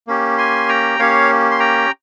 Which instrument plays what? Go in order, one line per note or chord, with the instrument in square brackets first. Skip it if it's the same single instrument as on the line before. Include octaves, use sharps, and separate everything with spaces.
[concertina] A#3 C#4 G4
G#5 C6
G5 A#5
A#3 C#4 G4 C#5 F5
C6
G5 A#5